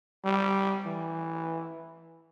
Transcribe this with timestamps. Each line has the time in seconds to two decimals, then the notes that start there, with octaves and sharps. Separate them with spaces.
0.25 G3
0.86 E3